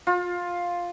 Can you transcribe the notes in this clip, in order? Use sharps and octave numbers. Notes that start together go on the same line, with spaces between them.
F4